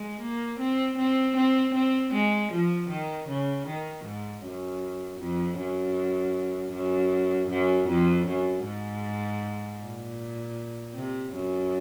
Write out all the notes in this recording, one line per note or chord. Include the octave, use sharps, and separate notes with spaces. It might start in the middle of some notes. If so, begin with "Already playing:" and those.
Already playing: G#3
A#3
C4
C4
C4
C4
G#3
F3
D#3
C#3
D#3
G#2
F#2
F2
F#2
F#2
F#2
F2
F#2
G#2
A#2
C3
F#2